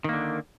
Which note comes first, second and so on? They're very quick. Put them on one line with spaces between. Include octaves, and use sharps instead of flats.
D#3 A#3 D3